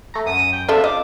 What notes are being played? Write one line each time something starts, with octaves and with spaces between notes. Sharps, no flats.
A3 A#5
F#2 D#6
G5
C4 D4 F4 A4 D5 E5
D#5 D6